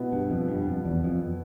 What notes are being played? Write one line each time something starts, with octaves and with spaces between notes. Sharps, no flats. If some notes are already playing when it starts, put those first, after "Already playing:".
Already playing: B2 B3 E4
G2
F2
G2
F2
E2
F2